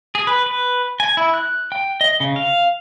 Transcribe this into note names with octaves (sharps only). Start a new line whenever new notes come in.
G#4
B4
B4
G#5
E4
F#6
G5
D#5
C#3
F5